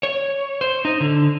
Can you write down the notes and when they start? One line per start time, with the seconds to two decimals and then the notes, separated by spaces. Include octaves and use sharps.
0.03 C#5
0.61 C5
0.85 D#4
1.00 D3